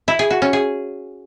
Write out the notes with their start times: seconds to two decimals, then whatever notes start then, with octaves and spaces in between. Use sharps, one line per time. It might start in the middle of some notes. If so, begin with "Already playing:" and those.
0.08 E4
0.19 G#4
0.30 F#4
0.42 C#4
0.53 G#4